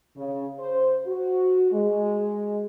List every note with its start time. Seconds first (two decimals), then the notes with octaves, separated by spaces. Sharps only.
0.17 C#3
0.59 C5
1.05 F#4
1.72 G#3